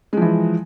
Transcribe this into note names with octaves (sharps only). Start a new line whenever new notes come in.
E3 F3 G#3